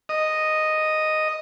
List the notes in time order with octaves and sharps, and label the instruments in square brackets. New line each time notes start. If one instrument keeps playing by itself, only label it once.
[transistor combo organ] D#5